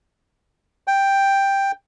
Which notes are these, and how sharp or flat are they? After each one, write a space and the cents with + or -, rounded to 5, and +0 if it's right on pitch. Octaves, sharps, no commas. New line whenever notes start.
G5 +5